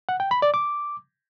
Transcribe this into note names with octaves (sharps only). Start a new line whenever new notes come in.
F#5
G5
B5
D5
D6